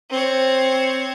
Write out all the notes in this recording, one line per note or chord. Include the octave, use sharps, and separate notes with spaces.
C4 C#5